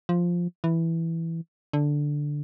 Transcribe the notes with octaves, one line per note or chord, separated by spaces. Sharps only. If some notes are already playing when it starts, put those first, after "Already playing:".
F3
E3
D3